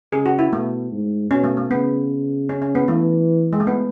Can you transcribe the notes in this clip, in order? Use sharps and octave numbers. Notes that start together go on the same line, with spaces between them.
C#3 G#4
F#4
E4
B2 A3
G#2
B2 C#4
A3
A3
C#3 B3
C#4
C#4
B3
E3 A3
G#3
A3
B3